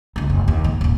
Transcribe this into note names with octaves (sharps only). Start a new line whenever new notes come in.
C#2 D#4
F1
D#2
G#2
D#1 D#4